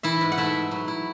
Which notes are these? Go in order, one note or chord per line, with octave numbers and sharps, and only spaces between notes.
E3 E4 E5
G#2
F#5
A3 E4 E5
G#2
F#3
E4